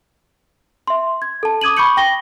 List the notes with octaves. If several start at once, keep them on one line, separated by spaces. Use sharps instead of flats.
E5 C6
G#6
A4 A5
D6 D#6 G#6 D#7 F#7
B5 C#6 D6 G6 C#7 F#7
G5 A#6 G7